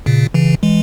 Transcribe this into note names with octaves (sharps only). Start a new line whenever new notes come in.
A#2 C#3
C#3 E3
E3 G#3